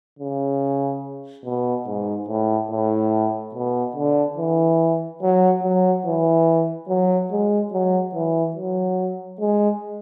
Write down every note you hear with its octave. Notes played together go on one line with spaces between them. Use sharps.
C#3
B2
G#2
A2
A2
B2
D3
E3
F#3
F#3
E3
F#3
G#3
F#3
E3
F#3
G#3